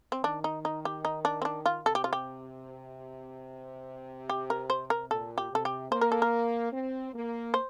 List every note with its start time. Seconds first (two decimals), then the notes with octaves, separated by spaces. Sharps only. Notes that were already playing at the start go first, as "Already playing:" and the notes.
0.12 C4
0.24 D#3 D4
0.44 D#4
0.65 D#4
0.85 G4
1.05 D#4
1.25 D4
1.42 C4
1.45 D4
1.66 F4
1.86 C3 A4
1.95 G4
2.04 F4
2.13 G4
4.29 G4
4.50 A#4
4.70 C5
4.90 A#4
5.11 A#2 A4
5.38 G4
5.52 C3 A4
5.65 G4
5.91 A#3 C5
6.01 A#4
6.12 A4
6.22 A#4
6.73 C4
7.14 A#3
7.54 C5